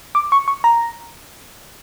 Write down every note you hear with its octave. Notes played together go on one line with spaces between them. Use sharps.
D6
C#6
C#6
A#5